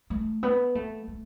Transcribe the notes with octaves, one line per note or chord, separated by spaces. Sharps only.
A3
B3
A3
A3